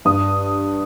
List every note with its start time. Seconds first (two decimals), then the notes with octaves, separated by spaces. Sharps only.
0.05 G2 D#6